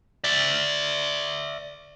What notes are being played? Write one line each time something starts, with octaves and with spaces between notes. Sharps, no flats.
D5 E5